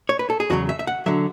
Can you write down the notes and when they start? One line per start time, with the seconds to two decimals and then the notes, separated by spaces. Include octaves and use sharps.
0.09 C#5
0.19 B4
0.30 A4
0.40 G#4
0.50 E2 C#3 F#3 F#4
0.69 E5
0.79 E5
0.87 F#5
1.06 D3 F#3 E5